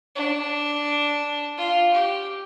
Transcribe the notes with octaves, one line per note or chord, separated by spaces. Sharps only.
D4
F4
G4